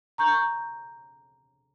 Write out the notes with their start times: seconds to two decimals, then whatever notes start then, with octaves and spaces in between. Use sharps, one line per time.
0.18 A#5 C#6 G6